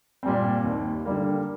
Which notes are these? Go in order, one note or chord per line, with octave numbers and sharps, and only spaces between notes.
A#2 G3 C4
D#2
D3 G3 A#3